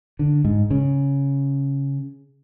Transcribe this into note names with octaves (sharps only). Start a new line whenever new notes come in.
D3
G#2
C#3